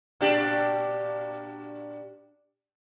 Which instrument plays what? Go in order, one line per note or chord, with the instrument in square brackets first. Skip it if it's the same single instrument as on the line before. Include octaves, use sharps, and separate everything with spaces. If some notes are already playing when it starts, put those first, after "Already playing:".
[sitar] A#2 D4 G4